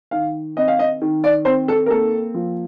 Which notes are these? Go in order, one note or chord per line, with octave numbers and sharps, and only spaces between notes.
D#3 F5
C4 D#5
F5
D#5
D#3
D5
C4 C5
A4
A#4
A#3 A4
F3